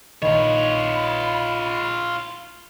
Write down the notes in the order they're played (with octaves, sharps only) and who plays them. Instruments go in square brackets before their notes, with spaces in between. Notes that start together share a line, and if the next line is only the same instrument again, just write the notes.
[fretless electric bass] A#1 D#3 [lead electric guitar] F4 C#5 [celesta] D#5 [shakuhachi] B5